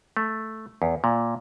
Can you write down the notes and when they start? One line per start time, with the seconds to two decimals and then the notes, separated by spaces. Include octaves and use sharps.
0.17 A3
0.82 E2
1.04 A#2